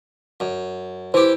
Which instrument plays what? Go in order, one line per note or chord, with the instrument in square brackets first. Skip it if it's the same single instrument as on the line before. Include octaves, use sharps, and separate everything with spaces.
[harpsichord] F#2
[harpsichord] E3 G4 [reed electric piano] C5